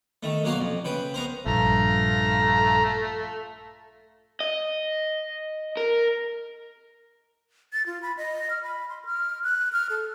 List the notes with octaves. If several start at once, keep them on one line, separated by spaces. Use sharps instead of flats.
D#3 A3
B1 F#3 A#3 F#4 F5 C6
F2
C#3 B4 G5
B3 A#4 C5
A#1 G2 A3 F4 A#5
D#5
A#4
A6
F4
B5
D#5
F6
B5
C6
F6
F#6
F6
A4